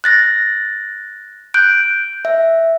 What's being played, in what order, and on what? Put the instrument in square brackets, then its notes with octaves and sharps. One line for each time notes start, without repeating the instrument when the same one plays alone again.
[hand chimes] F#6 A6 A#6
F#6 G6 D7
E5